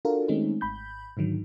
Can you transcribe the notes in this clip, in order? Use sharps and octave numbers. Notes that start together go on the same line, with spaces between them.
D4 F4 F#4 A4 A#4
D#3 G#3 A3 C4 C#4 D#4
G#1 B5 G6
G#2 D3 D#3 F#3